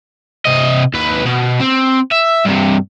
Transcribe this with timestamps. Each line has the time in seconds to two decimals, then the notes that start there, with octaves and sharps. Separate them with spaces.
0.45 C3 D#5
0.94 D#2 B4
1.25 B2
1.60 C4
2.12 E5
2.45 G2 C3